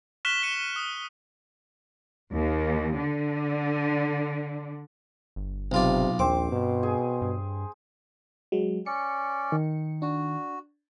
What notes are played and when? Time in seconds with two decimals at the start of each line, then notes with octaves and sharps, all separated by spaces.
0.25 C#6 F6 F#6 B6 E7 G7
0.43 B6 C#7 D#7
0.76 D#6
2.33 D#2
2.99 D3
5.36 G1
5.72 B1 C3 F4 D5
6.19 A#1 D#2 C4 C5 D6
6.52 G2 B2
6.83 G#4 G#5 D#6
7.22 G2
8.52 F#3 G#3
8.86 C#4 D5 C#7
9.52 D#3
10.02 D4 F#4